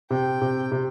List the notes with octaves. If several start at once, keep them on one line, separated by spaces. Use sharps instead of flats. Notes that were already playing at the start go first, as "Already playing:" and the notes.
C3 G5
C3
C3